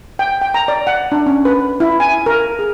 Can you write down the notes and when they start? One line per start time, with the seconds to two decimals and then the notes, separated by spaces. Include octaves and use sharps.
0.19 G5
0.42 G5
0.54 A#5
0.68 D5
0.87 F#5
1.12 D4
1.26 C#4
1.45 B4
1.80 E4
2.00 G#5
2.26 A#4
2.59 G#4